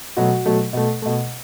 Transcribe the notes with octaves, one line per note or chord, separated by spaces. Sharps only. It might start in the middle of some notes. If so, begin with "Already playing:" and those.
B2 F#3 A3 F#4
B2 F#3 A3
B2 A3
B2 A3